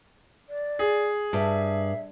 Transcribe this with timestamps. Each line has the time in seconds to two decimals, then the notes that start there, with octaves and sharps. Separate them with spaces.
0.49 D5
0.79 G#4
1.33 G2 E5